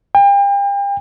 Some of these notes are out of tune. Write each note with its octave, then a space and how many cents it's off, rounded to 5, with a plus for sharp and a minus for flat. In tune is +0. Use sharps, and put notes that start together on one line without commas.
G5 +40